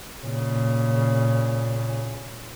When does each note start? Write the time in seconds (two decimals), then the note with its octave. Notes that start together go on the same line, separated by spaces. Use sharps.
0.24 A#2 C#3